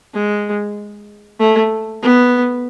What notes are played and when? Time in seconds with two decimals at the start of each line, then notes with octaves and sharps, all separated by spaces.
0.14 G#3
1.39 A3
2.02 B3